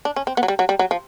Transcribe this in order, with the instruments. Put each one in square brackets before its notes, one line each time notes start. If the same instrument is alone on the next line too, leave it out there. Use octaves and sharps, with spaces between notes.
[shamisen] D4
C#4
C4
B3
F#3
G3
F#3
G3
F#3
F3